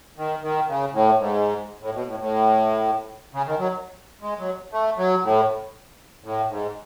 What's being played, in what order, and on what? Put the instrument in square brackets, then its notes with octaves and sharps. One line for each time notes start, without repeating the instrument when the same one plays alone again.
[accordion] D#3
D#3
C#3
A2
G#2
A2
B2
A2
A2
C#3
D#3
F#3
G#3
F#3
A3
F#3
A2
A2
G#2